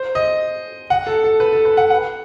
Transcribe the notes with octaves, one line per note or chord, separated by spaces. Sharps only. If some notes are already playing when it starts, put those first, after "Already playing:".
Already playing: C5
D#5
F#5
A4
A4
B4
A4
B4
F#5
F#5